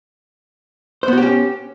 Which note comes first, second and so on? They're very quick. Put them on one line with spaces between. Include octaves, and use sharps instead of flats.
C5 B3 F#4 G4 C#4